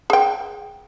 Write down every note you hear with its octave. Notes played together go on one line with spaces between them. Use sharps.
G#4 G5